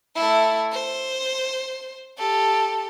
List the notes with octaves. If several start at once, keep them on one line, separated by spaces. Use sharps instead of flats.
A3 E4
C5
G4 A4